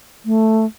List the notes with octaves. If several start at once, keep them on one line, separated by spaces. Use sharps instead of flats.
A3